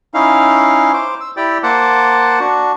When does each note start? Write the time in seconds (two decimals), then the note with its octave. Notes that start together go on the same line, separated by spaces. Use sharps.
0.14 C#4 D#4 E4 F5
0.93 C5 D6
1.21 E6
1.37 E4 G4 D5 G5
1.63 A#3 C5 F#5 A5 D6
2.40 D4 F#4